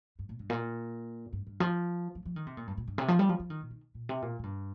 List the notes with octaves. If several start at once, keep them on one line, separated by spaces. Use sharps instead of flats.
G2
A#2
G2
A#2
G2
G2
F3
F3
F3
D#3
C3
A#2
G2
A#2
G2
C3
F3
G3
F3
F3
D#3
A#2
D#3
A#2
C3
A#2
A#2
G2